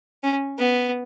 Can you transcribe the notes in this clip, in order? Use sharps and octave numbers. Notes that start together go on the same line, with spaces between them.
C#4
B3